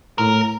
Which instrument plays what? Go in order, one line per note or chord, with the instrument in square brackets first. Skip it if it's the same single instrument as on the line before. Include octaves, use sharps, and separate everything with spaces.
[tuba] A2 [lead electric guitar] A#4